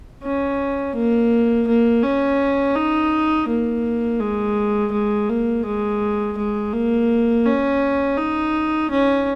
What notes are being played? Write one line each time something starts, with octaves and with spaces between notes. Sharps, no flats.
C#4
A#3
A#3
C#4
D#4
A#3
G#3
G#3
A#3
G#3
G#3
A#3
C#4
D#4
C#4